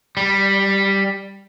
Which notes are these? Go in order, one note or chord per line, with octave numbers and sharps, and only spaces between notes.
G3